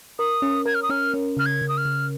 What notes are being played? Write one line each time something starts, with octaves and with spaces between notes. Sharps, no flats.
A#4 D#6
C#4
A#4 G#6
F6
D#6
C#4 F6
C#4
C#3 F6
G#6
C#3
D#6
F6
C#3